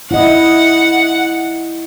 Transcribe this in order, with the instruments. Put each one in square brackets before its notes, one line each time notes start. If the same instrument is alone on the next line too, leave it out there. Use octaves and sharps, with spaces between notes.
[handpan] E4 D#5 [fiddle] F#5